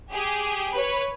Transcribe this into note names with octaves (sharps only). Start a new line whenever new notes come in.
G4 G#4
B4 C#5